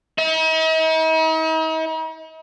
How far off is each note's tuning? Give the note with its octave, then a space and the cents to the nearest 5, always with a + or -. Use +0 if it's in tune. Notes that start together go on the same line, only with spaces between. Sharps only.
D#4 +45